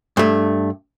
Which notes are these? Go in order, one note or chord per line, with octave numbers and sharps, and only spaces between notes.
G2 A3